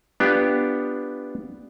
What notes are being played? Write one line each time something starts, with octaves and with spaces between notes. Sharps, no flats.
B3 D4 F4 G4